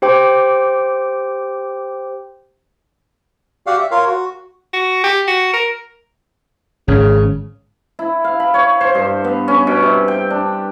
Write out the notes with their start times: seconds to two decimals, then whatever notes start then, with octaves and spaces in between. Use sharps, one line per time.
0.02 G4 C5 G5 D6
3.67 F#4 G4 D5 F5 F#5
3.79 E5
3.91 F4 A#4 C#5 F5
4.07 F#4
4.73 F#4
5.04 G4
5.27 F#4
5.54 A#4
6.88 G#1 C#3
7.99 E4
8.24 F5
8.40 B5
8.54 C#5
8.81 C5
8.95 G2
9.24 B3
9.48 C#4
9.67 B2
9.83 C3
10.08 G5
10.30 D4